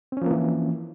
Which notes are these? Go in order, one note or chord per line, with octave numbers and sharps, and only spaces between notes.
E3 F3 A#3 C4 C#4